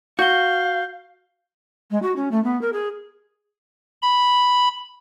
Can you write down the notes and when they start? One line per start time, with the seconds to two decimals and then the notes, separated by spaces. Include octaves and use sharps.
0.19 F#4 F5 G6 G7
1.91 G#3
2.02 F#4
2.16 C#4
2.32 A3
2.44 B3
2.62 A#4
2.73 G#4
4.02 B5